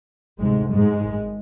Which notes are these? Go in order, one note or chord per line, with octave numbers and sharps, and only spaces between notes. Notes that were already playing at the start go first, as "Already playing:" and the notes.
D2 G#2 C3 G#3
G#2 G#3
G#1 G#2